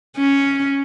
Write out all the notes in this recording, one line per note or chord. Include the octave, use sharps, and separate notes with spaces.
C#4